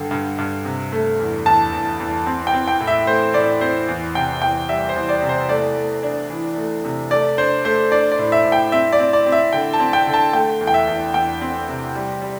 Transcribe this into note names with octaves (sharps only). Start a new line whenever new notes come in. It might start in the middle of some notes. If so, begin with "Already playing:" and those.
Already playing: G2 D3 G5
G2
G2
C3
A3
E2
E2 A5
E2
E2
C4
G5
C4
G5
A2
E5
A3 C5
A2 D5
C4 C5
E2
C3 G5
E2 G5
G3 E5
C5
E2
D5
C3
C5
A3 D5
A3
D4
E3
A3
C3
A3 D5
D4 C5
A3 C5
D4 D5
D5
A2
E5
A2
G5
C4 E5
D5
C4
D5
C4
E5
D3 G5
A5
C4
G5
D3
A5
A3 G5
E2
G5
E5
E2
E2 G5
C4
C3
G3
G3